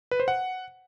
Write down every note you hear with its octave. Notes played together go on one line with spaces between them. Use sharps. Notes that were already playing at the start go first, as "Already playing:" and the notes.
B4
C5
F#5